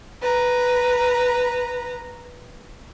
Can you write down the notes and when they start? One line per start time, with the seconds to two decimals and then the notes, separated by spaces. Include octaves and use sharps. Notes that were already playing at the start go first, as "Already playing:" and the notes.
0.22 B4 A#5